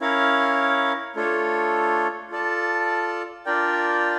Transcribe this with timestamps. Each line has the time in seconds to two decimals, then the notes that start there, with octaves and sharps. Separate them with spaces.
0.01 C#4 E4 A#4 C#5 F5
1.15 A3 D4 F4 A4 C#5
2.31 F4 A4 D5 A5
3.45 D4 F4 A#4 D5 G5